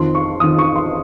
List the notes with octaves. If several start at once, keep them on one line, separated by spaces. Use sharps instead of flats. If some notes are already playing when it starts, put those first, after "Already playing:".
Already playing: F2 D#3 C6
C#6
F2 D#3 D#6
C#6
C6